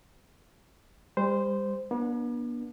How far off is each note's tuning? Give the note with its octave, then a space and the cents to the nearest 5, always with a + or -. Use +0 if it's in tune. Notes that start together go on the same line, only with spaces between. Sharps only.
G3 +35 C5 -10
B3 -45 D4 +0